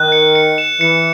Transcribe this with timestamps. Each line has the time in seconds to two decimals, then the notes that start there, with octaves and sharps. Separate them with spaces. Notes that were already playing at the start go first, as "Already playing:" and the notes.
Already playing: D#3 F#6
0.12 C#7
0.35 C#7
0.58 E7
0.80 E3 C#7